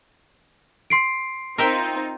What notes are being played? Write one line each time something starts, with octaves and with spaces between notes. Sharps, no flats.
C6 C7 D7
C4 D#4 F4 A#4 E5 G5